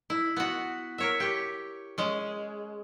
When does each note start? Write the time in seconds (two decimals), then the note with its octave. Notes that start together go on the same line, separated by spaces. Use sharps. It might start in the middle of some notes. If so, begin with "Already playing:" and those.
0.10 E4
0.36 B3 F#4
0.98 A#4 C#5 E5
1.20 G4 C#5
1.98 G#3 C#4